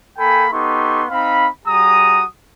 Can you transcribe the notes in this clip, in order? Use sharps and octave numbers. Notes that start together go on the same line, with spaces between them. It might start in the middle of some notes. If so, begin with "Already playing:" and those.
A#3 A4 G5 G#5 B5
B3 D#4 G4 A4 C6 C#6
C4 D#4 F5 B5
G3 F#4 G#4 A#5 D#6